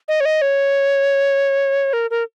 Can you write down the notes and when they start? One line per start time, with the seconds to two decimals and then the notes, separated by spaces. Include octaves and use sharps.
0.08 D#5
0.20 C#5
0.25 D#5
0.41 C#5
1.93 A#4
2.10 A#4